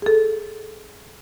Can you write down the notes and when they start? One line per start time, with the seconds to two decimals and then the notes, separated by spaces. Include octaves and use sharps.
0.02 G#4 A4